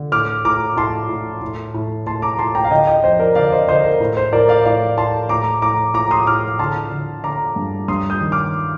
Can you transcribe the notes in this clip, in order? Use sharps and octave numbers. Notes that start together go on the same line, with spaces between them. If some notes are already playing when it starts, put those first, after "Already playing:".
Already playing: D3
A2 D6 F6
A2 A#5 D6
A2 A5 C6
A2
A2
A2
A2 A5 C6
A#5 D6
A2 A5 C6
G5 A#5
F5
D3 D#5 G5
D#5 G5
F2 C5 D#5
A#4 D5
D3 D5 F5
C5 D#5
D3 C5 D#5
A#4
A2
C5
A2 A#4 D5
D5 F5
A2 D5 F5
A2 A5 C6
A2 A#5 D6
A2 A#5 D6
A2 A#5 D6
C6 D#6
A2 D6 F6
D3 A5 C6
D3
D3 A#5 D6
G2
G2 C6 D#6
D#6 G6
D#3
D6 F6